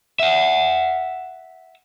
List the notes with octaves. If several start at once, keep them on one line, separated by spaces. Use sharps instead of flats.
E5 F#5